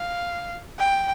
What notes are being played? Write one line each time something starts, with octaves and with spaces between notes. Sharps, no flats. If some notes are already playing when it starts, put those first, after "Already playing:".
Already playing: F5
G5